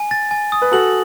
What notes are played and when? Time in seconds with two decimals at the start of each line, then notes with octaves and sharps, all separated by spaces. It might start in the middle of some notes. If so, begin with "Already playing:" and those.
Already playing: G#5
0.11 A6
0.31 G#5
0.52 D#6
0.62 B4
0.72 F#4 A4 F#7